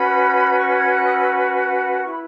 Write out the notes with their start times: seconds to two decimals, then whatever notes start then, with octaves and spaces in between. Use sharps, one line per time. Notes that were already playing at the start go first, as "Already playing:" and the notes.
Already playing: C#4 F#4 B4 B5
0.59 C#6
0.76 G#6
0.94 F#6
1.06 D#6
1.12 E6
1.30 C#6
2.02 E4 B4 C#6
2.11 B5